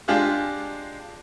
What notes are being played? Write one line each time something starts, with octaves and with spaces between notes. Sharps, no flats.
G#3 D4 F4 G4 G#4